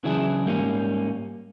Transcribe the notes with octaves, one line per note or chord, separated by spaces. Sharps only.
C#3 E3 F#3 D4 E4 G#4
G#2 G3 A#3 B3 C#4